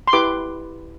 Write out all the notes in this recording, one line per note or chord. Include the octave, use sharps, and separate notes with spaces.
C6
E4 G4 B4 D6